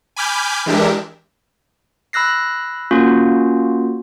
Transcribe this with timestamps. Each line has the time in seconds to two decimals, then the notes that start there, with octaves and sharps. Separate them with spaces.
0.16 G#5 B5 D6 F6 G6
0.66 E3 G#3 D4 G4 A#4 E5
2.13 B5 E6 F#6 A#6 C7
2.91 A#3 C#4 F4 F#4